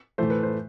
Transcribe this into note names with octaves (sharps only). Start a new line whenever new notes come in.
A2 E3 A3 C5
B4
C5